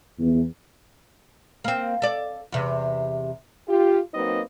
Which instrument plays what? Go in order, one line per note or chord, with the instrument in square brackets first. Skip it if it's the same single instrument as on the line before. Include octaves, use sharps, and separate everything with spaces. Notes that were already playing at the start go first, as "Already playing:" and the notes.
[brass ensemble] E2
[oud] A#3 C4
A4 D5
E2 C3
[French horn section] F4 G4
F#3 A#3 C4 D#4 B4 D#5